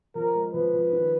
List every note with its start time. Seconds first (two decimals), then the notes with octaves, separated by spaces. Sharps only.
0.15 F3 A#4
0.34 G#3
0.53 F3 B4
0.73 F3
0.92 D#3